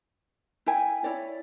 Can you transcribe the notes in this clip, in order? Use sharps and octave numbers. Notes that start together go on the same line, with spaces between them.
E4 G5 G#5
E4 C#5 D5